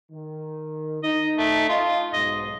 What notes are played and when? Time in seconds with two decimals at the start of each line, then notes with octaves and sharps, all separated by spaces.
0.12 D#3
1.03 D#4 D#5
1.38 A3
1.69 F4 D#5
2.13 B1 G#2 D#5